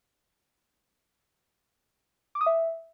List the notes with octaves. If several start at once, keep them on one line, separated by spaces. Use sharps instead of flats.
D6
D#6
E5